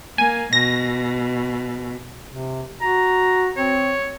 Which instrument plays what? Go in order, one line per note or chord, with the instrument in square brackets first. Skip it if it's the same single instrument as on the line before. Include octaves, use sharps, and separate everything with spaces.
[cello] A#3 [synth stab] G#5
[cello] B2 [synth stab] A#6
[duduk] C3
[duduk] F#4 [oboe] A#5
[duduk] C4 [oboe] C#5